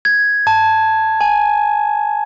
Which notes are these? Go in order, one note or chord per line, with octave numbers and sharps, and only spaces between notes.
G#6
A5
G#5